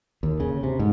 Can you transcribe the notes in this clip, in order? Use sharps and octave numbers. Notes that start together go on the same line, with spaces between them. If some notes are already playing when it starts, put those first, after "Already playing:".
D#2
C#3
C3
G#2